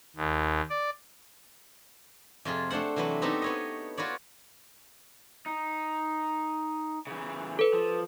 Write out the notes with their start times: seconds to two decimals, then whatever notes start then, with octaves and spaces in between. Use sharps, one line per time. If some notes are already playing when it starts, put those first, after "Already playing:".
0.16 D#2
0.70 D5
2.45 F2 C3 F4 G#4
2.70 A3 D4 C5 F#5
2.96 C3 E3 F#3 C4 B4
3.22 B3 C4 D#4 F#4 G4 A4
3.42 B3 C#5 D#5
3.97 F4 F#4 B4 C#5 D5
5.46 D#4
7.07 C#3 E3
7.59 A4 B4
7.73 F3